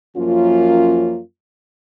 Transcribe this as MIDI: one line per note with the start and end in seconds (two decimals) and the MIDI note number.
0.17 1.19 42
0.17 1.19 53
0.17 1.19 58
0.17 1.19 61
0.17 1.19 65